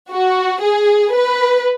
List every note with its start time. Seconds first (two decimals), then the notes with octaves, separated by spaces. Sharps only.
0.11 F#4
0.62 G#4
1.14 B4